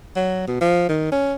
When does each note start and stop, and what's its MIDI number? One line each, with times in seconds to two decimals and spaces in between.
0.16 0.47 54
0.48 0.56 47
0.61 0.85 53
0.89 1.08 51
1.12 1.34 61